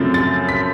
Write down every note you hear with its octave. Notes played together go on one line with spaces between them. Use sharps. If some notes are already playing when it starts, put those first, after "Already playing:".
Already playing: F#2 C#3 F3 A3 C4 A6
A6
B6